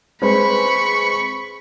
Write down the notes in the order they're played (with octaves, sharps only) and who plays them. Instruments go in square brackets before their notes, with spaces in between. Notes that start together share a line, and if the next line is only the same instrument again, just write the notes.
[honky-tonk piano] G#3 C4 B4 [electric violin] B5 C#6